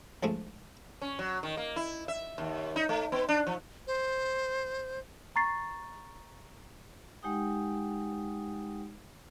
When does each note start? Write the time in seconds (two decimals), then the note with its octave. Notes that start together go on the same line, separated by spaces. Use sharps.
0.23 A#1 F3 G#3 A3
1.02 C#4
1.19 F#3
1.43 D#3
1.57 A#3
1.76 E4
2.08 E5
2.38 D#2
2.76 D#4
2.89 A3
3.12 B3
3.29 D4
3.47 F3
3.87 C5
5.36 A#5 C#6 A6 C7
7.23 G#3 D#4 G4 F#5 G5 D#6